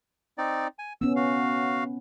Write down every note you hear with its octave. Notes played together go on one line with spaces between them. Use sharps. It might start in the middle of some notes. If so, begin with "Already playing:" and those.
C4 D#4 D5
G#5
B3 C#4 E6
F#4 F5